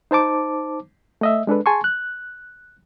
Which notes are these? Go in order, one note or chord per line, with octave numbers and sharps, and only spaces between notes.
D#4 C5 A5 D6
A3 D#5 E5
G#3 D4 A4 B4
G#4 G#5 A5 C6 C#6
F#6